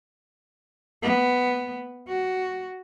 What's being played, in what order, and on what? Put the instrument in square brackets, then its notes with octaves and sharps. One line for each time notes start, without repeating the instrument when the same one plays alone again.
[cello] B3
F#4